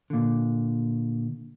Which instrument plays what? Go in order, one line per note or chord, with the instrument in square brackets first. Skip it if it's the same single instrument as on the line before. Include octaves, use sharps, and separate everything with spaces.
[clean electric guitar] A#2 D3